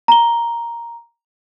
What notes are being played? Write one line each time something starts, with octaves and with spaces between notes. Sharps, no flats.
A#5 G7